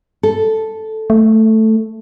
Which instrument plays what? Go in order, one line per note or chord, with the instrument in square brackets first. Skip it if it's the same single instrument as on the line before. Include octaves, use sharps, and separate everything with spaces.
[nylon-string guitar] A4
[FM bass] A3